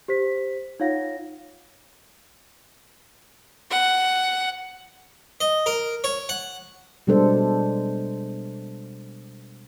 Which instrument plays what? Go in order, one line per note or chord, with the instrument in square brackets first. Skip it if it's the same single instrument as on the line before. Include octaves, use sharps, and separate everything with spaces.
[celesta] G4 C5 B6
D#4 F4 C#5 F5 F#5 A#6
[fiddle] F#5
[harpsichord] D#5
A#4
C#5
F#5
[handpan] B2 G3 G#3 D4 A4 C5